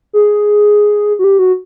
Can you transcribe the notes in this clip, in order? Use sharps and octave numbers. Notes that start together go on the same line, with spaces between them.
G#4
F#4
G4
F#4